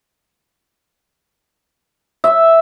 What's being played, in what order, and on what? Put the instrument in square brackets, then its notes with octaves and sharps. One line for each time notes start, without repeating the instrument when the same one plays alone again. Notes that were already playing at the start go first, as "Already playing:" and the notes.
[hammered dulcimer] E5